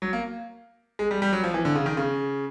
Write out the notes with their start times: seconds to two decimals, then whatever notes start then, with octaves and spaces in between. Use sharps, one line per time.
0.02 F#3
0.13 A#3
0.99 G#3
1.11 G3
1.22 G3
1.33 F#3
1.44 F3
1.54 E3
1.65 D3
1.75 C#3
1.86 D#3
1.97 C#3